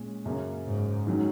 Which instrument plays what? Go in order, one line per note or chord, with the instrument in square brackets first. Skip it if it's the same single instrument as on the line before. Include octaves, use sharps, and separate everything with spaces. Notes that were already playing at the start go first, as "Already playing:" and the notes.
Already playing: [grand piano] A#2 G#3 C#4
F#2 C#3 A#3 C#4
[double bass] G#2
[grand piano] G#2 D#3 F#3 C#4